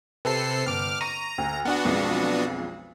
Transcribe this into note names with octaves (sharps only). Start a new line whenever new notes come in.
C3 A4 B4 C5 C7
G1 D6 F6
A#5 C#6 D#7
D2
B3 D4 F#4 F#5
B1 F2 G#3